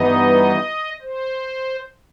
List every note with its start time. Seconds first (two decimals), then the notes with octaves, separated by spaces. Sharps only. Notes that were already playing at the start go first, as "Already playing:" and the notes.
Already playing: G2 E3 B3 D#4 D#5
1.02 C5